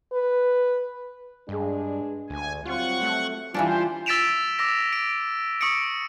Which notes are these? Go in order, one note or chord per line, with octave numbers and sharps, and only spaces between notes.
B4
G2 G#3 D4 G#4
D2 G#5
F#3 G3 C4 F4 F#5 C#6
A3
E3 G3 C#4 D4 F4 G4 C5
E6 A6 B6 D7 E7 F7
D6 E6 A#6
D7
C#6 D#6 C#7 D7